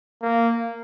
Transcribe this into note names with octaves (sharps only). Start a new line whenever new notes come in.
A#3